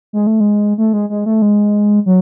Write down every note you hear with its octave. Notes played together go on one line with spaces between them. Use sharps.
G#3
A3
G#3
A3
G#3
G#3
A3
G#3
F#3